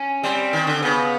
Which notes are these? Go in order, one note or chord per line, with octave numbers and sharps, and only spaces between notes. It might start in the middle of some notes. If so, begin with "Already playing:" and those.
Already playing: C#4
G3 C4
D#3
D3
C#3 B3